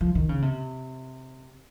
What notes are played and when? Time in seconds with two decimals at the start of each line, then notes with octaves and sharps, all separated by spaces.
0.01 F3
0.15 D#3
0.29 C#3
0.42 C3